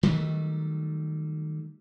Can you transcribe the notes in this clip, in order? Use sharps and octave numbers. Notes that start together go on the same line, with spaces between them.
D#3 F#3 G3 A3